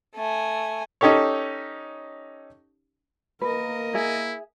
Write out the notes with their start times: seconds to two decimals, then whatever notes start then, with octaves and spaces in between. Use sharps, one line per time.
0.16 A3 G#5
1.01 C#4 D#4 G4 A4 C#5
3.41 A#3 A#4 B4 D#5
3.94 E4 G#4 E5